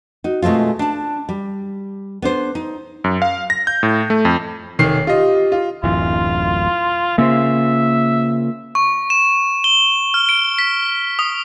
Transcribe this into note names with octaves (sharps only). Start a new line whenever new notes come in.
D#4 F#4
B2 G#3 A3 C4 F4
D4 A5
G3
B3 D4 C5
D#4
F#2
F5
A#6
G6
A2
A3
F2
F1 D#3 C#5 C7
F4 G4 D#5
F4
D1 F#2 E3 F4
C#3 A#3 F4 C5 E5
C#6
E7
G7
F6
D7
B6
D#6